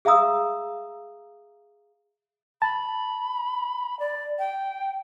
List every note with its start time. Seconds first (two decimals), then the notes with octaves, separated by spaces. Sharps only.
0.05 G#4 E5 F5 A#5 D#6 E6
2.62 A5 B5
3.99 D5
4.39 G5